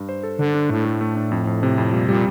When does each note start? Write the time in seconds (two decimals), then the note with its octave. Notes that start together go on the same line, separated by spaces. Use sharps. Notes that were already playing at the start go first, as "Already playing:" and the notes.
Already playing: G2
0.09 C5
0.23 A4
0.39 D3 D4
0.54 D4
0.69 A2 A3
0.85 A3
1.01 A3
1.16 D4
1.31 F2
1.47 F2
1.63 C3
1.78 F2
1.93 A#2 G3
2.09 A#2 G3